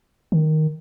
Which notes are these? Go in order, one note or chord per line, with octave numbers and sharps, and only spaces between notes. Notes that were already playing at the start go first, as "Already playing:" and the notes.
D#3